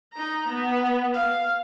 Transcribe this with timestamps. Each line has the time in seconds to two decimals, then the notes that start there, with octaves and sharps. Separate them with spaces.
0.13 D#4 A#5
0.48 B3
1.14 F5